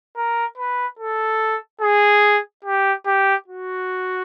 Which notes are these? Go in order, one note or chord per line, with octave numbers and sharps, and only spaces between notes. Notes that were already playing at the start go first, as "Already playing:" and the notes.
A#4
B4
A4
G#4
G4
G4
F#4